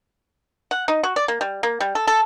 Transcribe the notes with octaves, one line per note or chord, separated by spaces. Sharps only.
F#5
D#4
F#4
D5
A#3
G3
A#3
G3
A4
A4